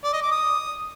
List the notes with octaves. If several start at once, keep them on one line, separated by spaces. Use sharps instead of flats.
D5
D#5
D6
D#6